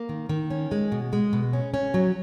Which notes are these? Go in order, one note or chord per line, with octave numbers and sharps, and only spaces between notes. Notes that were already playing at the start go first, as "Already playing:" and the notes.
Already playing: A#3
D#3
D#3
C#4
G#3
B2
G#3
B2
C#4
C#4
F#3